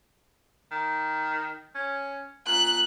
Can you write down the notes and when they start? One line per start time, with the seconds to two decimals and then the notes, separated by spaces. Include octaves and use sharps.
0.72 D#3
1.75 C#4
2.47 A#2 F#6